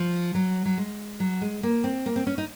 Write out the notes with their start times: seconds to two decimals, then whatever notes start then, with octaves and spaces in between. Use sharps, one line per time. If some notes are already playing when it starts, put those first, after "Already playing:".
Already playing: F3
0.35 F#3
0.65 F#3
0.78 G#3
1.20 F#3
1.41 G#3
1.63 A#3
1.84 C4
2.06 A#3
2.16 C4
2.27 C#4
2.38 D#4